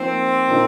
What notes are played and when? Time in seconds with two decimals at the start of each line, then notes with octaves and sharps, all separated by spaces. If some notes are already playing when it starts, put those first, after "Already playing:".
Already playing: F3 A#3 C4 D#4
0.48 A#2 A#3 D#4